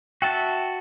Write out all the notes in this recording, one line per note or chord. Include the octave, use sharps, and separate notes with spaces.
F#4 E5 G5 A5